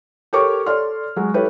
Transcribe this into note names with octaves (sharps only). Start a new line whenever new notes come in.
G4 A4 A#4 C#5 C#6 D6
A4 C#5 D5 C6 F6
F#3 G#3 F#4
E4 G4 A4 B4 C#5